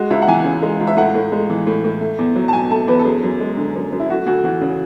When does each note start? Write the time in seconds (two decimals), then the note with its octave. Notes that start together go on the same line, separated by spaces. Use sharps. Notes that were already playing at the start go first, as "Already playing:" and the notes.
Already playing: G#3 F#4
0.10 C#2 E5
0.22 F#5
0.28 E3 G#5
0.45 C#3
0.62 G#3
0.80 C#2
0.87 E5
0.97 A2 F#5
1.15 A2
1.32 G#3
1.49 E3
1.67 A2
1.84 A2
2.01 A3
2.18 E2
2.36 F#3
2.48 A5
2.53 B2 G#5
2.70 A3 A5
2.87 E2 B4
2.99 A4
3.05 F#2 G#4
3.23 F#2
3.40 G#3
3.57 D3
3.75 F#2
3.92 F#2
4.00 E4
4.09 A3 F#4
4.26 D2 F#4
4.44 E3 F#4
4.61 C#3